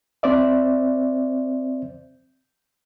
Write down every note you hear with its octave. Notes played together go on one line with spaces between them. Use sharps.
C4 C5 D5 E5